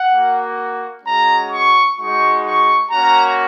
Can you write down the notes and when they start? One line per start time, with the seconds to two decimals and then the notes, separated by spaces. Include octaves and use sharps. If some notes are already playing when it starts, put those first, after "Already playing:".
Already playing: F#5
0.11 A#3 F#4
1.03 G#3 C#4 F#4 A#5
1.51 C#6
1.97 G#3 D#4 F#4 C#6
2.44 C#6
2.90 A#3 C#4 F#4 A#5